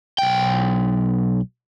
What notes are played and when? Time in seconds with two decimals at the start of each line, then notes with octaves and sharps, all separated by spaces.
0.18 B1 G5